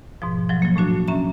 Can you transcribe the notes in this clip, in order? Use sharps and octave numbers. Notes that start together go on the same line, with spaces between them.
G#2 B2 F3
F3 F#3
F#3 A#3
A2 A3 D4 F#4
C#4 E5 A#5